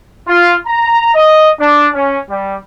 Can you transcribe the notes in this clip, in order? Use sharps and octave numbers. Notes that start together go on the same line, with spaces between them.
F4
A#5
D#5
D4
C#4
G3